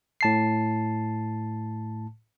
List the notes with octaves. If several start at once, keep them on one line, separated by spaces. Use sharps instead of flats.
A2 A5 C7